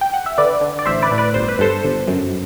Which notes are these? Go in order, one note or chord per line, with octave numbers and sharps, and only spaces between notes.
G5
F#5
E5
D3 B4 D5
D3
D5
A1 C5 E5
B4 D5
A2
B4 D5
G1 C5
B4
G2 A4 C5
G1
F#2